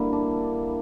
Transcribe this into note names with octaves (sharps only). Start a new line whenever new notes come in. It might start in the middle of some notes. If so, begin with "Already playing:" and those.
Already playing: D3 G3 A#3 E4
D4